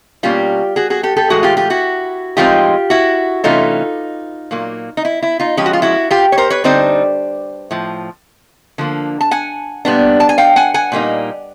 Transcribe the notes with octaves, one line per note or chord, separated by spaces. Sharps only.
B2 G3 A#3 C#4 F4 G4
F#4 G#4
F#4 G#4
G4 A4
G4 A4
A2 E3 G#3 F#4 G#4
F4 G4
F4 G4
E4 F#4
A2 F3 G#3 C4 D#4 F4 G4
E4 F#4
C3 E3 A3 C#4 D#4 F4
A#2 F#3 A#3
D#4
E4
E4
D#4 F4
F3 G#3 C#4 G4
F#4
F4
E4 F#4
F4 G4
C#5
A#4 C5
B4 C#5
D3 G3 C4 D#4 C5 D5
A2 F3
D3 F3 A#3
A5
F#5 G#5
A#2 G3 B3 D4
A5
G#5
F5 G5
F#5 G#5
F#5 G#5
A#2 G3 A#3 D#4